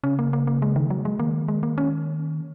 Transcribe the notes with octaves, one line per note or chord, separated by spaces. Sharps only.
C#3 C#4
A#3
A#3
A#3
G#3
D#3
F#3
G#3
D#3 A#3
G#3
A#3
C#4